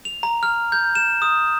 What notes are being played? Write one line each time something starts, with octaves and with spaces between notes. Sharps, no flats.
F7
A#5
F6
G6
E7
D#6